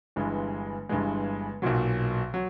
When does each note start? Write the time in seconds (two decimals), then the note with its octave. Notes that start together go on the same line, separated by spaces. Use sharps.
0.16 G1 G2 E3 G#3
0.89 G1 G2 E3 G#3
1.62 B1 A#2 F#3
2.34 F#3